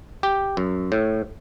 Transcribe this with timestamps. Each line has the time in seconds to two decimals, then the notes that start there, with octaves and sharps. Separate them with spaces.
0.23 G4
0.57 F#2
0.92 A2